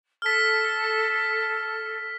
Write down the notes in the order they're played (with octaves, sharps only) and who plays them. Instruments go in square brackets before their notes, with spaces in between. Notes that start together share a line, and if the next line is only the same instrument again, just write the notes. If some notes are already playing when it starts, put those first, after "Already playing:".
[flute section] A4 [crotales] F6 B6